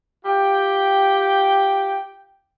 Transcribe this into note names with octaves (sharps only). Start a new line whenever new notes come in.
F4 G4 G5